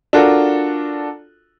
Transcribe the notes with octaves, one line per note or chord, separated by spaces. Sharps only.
D4 F4 F#4 A4 A#4